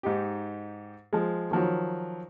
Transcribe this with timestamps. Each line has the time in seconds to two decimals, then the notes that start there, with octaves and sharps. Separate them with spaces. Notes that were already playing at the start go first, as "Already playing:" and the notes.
0.03 G#2 D#4 G4
1.13 F3 G#3
1.51 D#3 F3 F#3